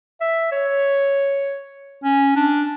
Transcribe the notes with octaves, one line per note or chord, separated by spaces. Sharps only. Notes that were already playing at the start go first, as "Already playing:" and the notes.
E5
C#5
C#4
D4